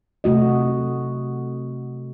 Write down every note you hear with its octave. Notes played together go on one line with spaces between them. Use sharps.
C3 A3 F#4 D#5